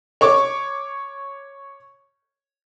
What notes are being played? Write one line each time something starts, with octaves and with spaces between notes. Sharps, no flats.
C#5 C#6 D6